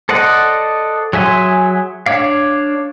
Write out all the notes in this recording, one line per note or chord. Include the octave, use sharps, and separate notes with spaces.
A4 C5 D5 D#5 F#5
F#3 G#4 E5 G#5 C6
D4 C#5 D5 F5